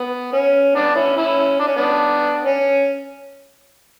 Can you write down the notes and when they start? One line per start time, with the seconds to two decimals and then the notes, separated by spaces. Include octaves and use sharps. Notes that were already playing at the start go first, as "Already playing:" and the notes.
Already playing: B3
0.32 C#4
0.74 B3 D4
0.95 C#4 E4
1.16 C#4 E4
1.59 D4
1.67 C#4
1.76 B3 D4
2.44 C#4